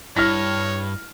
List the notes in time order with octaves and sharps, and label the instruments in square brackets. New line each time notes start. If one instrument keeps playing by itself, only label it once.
[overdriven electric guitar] G2 [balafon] E4 [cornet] C#5 [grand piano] F6 A#6